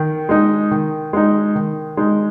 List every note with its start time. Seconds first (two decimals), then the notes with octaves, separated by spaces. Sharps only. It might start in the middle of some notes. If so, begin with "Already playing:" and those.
Already playing: D#3
0.29 G#3 D#4
0.71 D#3
1.13 G#3 D#4
1.55 D#3
1.97 G#3 D#4